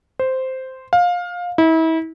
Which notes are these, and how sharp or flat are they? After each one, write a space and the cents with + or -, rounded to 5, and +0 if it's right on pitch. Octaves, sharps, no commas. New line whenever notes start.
C5 -5
F5 +20
E4 -35